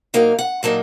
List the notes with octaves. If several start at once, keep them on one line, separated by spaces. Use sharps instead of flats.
A#2 F#3 A#3 D#4 F5
F#5
A#2 F#3 A#3 D#4 A5